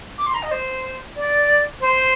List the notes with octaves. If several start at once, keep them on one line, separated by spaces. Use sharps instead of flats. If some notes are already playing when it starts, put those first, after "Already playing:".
D6
C6
A#5
D#5
C5
D5
C5